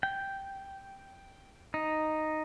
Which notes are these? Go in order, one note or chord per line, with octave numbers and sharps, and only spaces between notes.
G5
D#4